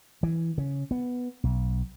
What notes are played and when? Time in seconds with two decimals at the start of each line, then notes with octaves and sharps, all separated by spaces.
0.23 E3
0.58 C#3
0.91 B3
1.44 B1